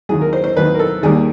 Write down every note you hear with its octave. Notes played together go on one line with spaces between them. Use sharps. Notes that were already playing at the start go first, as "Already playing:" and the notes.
D#2 D#3 F#3 G#4
A#4
C5
C5
D#2 D#3 F#3 B4
A#4
A4
D#2 D#3 G3 A#3 G#4